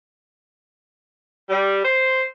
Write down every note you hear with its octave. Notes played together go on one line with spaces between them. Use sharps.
G3
C5